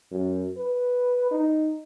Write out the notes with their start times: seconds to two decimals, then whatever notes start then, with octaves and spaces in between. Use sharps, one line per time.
0.11 F#2
0.57 B4
1.31 D#4